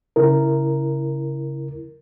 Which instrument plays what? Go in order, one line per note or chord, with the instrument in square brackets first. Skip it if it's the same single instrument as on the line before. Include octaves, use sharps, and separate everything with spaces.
[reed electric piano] C#3 E4 A#4